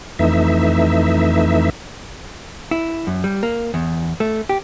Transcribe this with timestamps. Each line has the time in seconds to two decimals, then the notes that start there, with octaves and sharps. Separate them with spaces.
0.19 F2 E3 A3 D#4 E5
2.71 E4
3.07 F#2
3.24 G3
3.43 A#3
3.74 E2
4.20 A3
4.49 G4